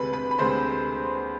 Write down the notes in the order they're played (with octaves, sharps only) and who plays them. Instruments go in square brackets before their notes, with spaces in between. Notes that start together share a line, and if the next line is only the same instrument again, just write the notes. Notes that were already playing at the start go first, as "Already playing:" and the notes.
Already playing: [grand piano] D2 C3 G#3 [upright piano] B4 B5
[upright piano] B4 B5
B5
[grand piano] D2 C3 G#3 [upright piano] C5 C6